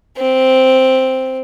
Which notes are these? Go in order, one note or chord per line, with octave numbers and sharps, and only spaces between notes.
C4